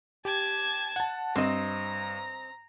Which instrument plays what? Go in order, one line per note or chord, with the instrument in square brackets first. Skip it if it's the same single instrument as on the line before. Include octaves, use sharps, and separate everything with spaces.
[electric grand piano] G4 [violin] A5 G#6
[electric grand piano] F#5 A5
[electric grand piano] G2 [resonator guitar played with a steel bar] C4 D#5 [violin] A#5